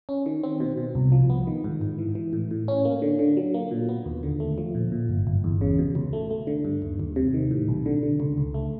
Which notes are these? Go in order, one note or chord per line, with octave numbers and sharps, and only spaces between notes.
C#4
D#3
C4
B2
B2
C2
F3
B3
D#3
G#2
G#2
E3
E3
A2
A2
C#4
A#3
D3
D3
F#3
A#3
A#2
B3
D#2
D3
A3
F3
A#2
A#2
G1
G1
E2
C#3
B2
C#2
A3
A3
D3
G2
D#2
D#2
C3
D#3
A2
B1
D3
D3
C#2
C#2
A3